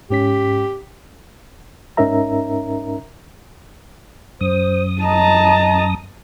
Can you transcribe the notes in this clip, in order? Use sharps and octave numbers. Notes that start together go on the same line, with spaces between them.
G#2 C#4 G4 B6
G#2 C#4 D#4 A#4 E5 A#5
F#2 C5 D#6
D#5 A5 A#5